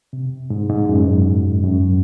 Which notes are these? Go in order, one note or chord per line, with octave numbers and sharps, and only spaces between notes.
C3
G#2
G#2
F#2
F#2